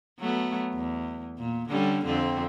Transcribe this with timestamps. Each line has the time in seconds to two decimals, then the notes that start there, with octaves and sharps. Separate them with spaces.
0.19 F#3 A3 B3
0.73 E2
1.38 A#2
1.69 D3 G3 C#4
2.05 F2 D3 C4